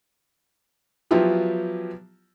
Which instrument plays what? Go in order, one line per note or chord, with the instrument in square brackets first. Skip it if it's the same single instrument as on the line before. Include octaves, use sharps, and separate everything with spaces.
[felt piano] F3 F#3 B3 E4 F4 G4